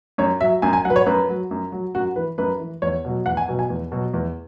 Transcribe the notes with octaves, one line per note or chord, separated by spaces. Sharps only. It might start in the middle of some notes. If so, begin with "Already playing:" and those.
F#2 C#5
F#3 E5
F#2 G#5
G#5
F#3 F#5
B4
C#5
F#2 B4
F#3
F#2
F#3
F#2 F#4
E3 B4
F#2 B4
E3
E2 C#5
B2 F#3
E2 F#5
G#5
B2 F#3
G#5
E2
B2 F#3
E2